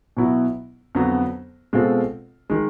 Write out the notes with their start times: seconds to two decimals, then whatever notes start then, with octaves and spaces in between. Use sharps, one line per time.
0.17 B2 F#3 B3 E4
0.95 F2 D3 F#3 B3
1.73 B2 G#3 C4 F4 A4
2.50 D#3 G#3